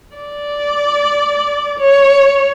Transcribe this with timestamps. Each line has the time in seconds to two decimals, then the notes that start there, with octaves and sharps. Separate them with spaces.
0.16 D5
1.79 C#5